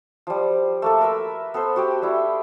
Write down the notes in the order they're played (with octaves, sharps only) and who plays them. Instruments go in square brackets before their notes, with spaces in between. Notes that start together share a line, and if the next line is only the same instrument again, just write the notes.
[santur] F3 G3
A3 A#3 A4
A#4 B4 E5
B3 A4 B4 C5
F#4 G4 G5
G3 E4